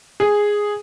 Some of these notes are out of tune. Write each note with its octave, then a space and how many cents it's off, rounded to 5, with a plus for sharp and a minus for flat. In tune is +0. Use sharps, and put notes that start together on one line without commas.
G#4 -5